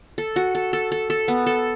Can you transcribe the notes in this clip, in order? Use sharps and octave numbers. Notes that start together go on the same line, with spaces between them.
A4
F#4
A4
A4
A4
A4
B3
A4